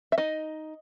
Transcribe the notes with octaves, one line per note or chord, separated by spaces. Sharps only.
E5
D#4 D#5